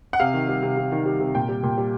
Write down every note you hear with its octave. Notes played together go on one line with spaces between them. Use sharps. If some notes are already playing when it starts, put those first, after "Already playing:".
F#5
C3 F5
D#3
G3
C3
C3
D#3
G3
C3
A#2 G5
G3
A#2
G3